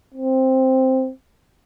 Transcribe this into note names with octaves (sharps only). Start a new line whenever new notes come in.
C4